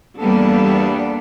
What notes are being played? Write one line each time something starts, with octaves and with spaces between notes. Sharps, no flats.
E2 G3 A#3 B3 D4 A4